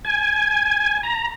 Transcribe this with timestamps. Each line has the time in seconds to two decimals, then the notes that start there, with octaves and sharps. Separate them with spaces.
0.05 G#5
1.03 A#5